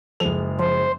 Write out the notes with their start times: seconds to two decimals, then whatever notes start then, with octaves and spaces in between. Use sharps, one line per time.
0.20 F#1 F3 G#3 A4 F7
0.59 F3 C5